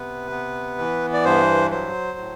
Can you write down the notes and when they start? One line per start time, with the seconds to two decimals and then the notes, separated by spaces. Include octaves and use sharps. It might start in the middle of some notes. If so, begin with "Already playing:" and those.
Already playing: C3 B3 B4
0.31 B3
0.79 E3
1.13 D5
1.25 G2 C5
1.71 F#3 C5
2.18 A2